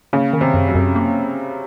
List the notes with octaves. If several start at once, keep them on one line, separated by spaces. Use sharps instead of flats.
C#3 A#3
D#3
C3
F#2
F#3
F#2
A#3